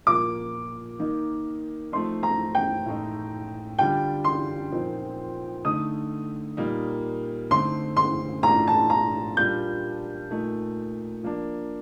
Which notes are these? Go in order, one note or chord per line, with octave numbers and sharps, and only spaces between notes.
A#2 F3 A#3 D6
D#3 A#3 D#4
F3 A3 C4 D#4 C6
A#5
G5
A2 A3 D#4
D3 G3 D4 F4 G5
C6
A#2 F3 C4 D#4
D3 A3 D#4 D#6
A#2 G3 A#3 D#4
D3 A3 C4 D#4 C6
C6
A2 A3 D4 F4 A#5
A5
A#5
A#2 G3 D4 F4 G6
A#2 A3 D#4
F3 A#3 D4